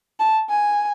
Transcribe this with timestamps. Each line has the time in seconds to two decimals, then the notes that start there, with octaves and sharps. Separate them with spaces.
0.20 A5
0.50 G#5